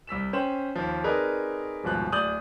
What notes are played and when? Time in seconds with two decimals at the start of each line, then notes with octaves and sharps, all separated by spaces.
0.07 C2 E6 B6 E7
0.33 C#4 C5 G5 E7 F#7
0.75 D#2 F3
1.04 C4 D#4 G#4 A#4 B4 D5
1.84 D#1 G#1 B2 F3 F#6
2.12 D1 D5 D#6 G6 F#7